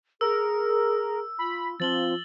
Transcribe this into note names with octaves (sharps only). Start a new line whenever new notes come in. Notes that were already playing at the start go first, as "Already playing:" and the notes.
G#4 A#4 E6
F4 B5
F3 C4 A6 F#7 G7